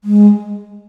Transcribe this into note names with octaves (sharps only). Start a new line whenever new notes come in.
G#3